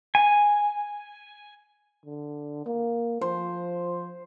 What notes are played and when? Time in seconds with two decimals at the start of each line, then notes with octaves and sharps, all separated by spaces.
0.15 G#5
2.06 D3
2.66 A#3
3.21 F3 C5